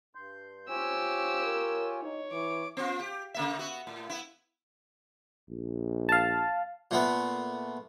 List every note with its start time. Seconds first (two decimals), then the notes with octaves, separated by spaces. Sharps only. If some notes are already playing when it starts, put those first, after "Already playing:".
0.15 G2 C6 G6
0.69 F4 G4 C5 C#5 G#5 E6
1.43 A#4
2.02 D#4 C#5
2.32 E3 C#6 D6
2.77 B3 F4
3.00 G4
3.34 C#3 A#3 E5
3.59 B3 F#4
3.87 A2
4.10 B3 E4
5.50 A#1
6.09 F5 A5
6.91 A#2 A3 B3